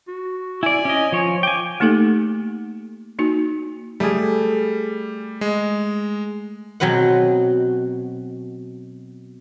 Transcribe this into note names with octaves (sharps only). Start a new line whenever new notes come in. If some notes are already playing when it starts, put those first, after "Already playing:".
F#4
E4 D5 G#5
C#4 D#5
F3 C#5
G5 G#5 D6
A3 A#3 D#4 G4 A4
A#3 D#4 F#4
G3 A3 G#4
G#3
B2 F#3 C4 B4 F#5